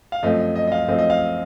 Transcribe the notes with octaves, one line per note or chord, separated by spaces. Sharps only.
F5
F#2 F3 A3 C4 D#5
D#5
D#5
D#5
F5
F#2 F3 A3 C4 D#5
D#5
F5